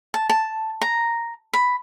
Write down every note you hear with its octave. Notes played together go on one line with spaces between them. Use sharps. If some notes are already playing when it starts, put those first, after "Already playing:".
A5
A5
A#5
B5